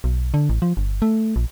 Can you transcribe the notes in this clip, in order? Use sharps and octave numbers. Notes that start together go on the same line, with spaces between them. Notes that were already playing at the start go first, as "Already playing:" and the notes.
B1
D3
A1
F3
G1
A3
A#1